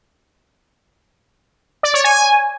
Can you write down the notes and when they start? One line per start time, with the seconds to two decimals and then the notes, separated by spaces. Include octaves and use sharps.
1.83 D5
1.94 C#5
2.04 G#5